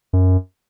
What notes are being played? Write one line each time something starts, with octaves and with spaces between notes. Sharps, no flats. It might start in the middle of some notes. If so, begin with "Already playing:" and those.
F#2